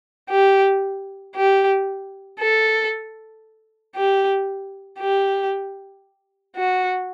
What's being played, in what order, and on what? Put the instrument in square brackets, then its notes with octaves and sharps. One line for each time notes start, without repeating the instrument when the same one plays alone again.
[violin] G4
G4
A4
G4
G4
F#4